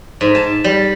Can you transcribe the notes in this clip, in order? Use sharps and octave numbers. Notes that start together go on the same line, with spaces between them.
G#2
A5
G3